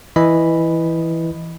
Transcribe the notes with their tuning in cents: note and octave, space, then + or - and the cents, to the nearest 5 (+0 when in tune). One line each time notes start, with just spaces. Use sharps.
E3 +0 D#5 -5 B5 +0